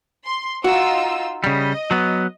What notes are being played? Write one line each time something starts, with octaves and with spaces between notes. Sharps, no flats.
C6
D#4 F4 F#4 E6
C#3 G3 D#5
F#3 B3